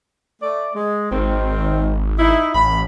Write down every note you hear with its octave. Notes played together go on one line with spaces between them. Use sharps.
A3 D5
G#3
G#1 D#3 C4
D#4 E4
A1 B5